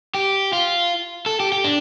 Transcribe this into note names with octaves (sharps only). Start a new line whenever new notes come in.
G4
F4
A4
G4
G4
D4